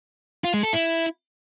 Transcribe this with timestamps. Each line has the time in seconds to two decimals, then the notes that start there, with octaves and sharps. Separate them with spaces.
0.44 F4
0.54 G#3
0.63 A4
0.73 E4